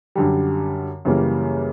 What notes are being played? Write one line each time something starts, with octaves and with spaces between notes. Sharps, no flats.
F#2 D3 G3
F#2 C#3 E3 G3 A#3